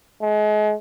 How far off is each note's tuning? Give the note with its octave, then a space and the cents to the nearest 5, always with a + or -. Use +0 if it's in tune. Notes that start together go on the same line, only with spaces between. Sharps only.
G#3 +35